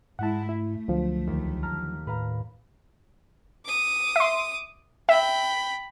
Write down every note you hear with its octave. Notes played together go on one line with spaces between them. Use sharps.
G#2 G#3 E4 F#5 A5
A3 E4
C#2 D3 F3 F#3
D#2
A5 A#5 F6
A2 B4 F5 A#5
D6 D#6
E5 C6
E5 G5 B5